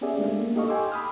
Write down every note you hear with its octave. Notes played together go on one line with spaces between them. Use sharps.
B3 C#4 G4 G#4 D5 E5
G#3 A3 D4 F5
A#3
D#4 G4 A4 D#5 F5 C#6
G5 G#5 C6 D6 E6
B5 D#6 F6